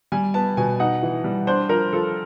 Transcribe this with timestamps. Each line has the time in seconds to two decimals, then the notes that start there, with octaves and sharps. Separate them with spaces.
0.12 G3 G#5
0.34 B3 A5
0.57 B2 G#5
0.79 D#4 F#5
1.03 E3
1.24 G3
1.47 D4 C5
1.69 F3 A#4
1.93 F3 A4